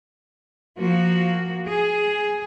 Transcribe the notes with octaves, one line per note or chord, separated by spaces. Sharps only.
F3 A#3 F#4
G#4